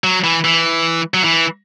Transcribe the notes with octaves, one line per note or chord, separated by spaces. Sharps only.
F#3
E3
E3
F#3
E3